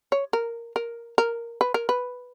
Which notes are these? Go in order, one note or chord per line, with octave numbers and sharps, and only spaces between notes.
C#5
A#4
A#4
A#4
B4
A#4
B4